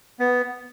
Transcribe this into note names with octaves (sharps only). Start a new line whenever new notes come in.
B3